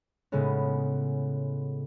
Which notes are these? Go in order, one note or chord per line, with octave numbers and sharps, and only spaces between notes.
A2 C#3 G#3 B3 C#4